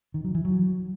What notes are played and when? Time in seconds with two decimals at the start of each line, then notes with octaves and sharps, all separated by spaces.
0.14 D#3
0.24 F#3
0.35 E3
0.45 F#3